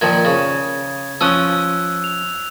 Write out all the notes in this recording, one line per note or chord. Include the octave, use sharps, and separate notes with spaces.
A#2 D#3 F3 G#6
C#3
F3 C#4 D#6 E6 F#6 G7
F7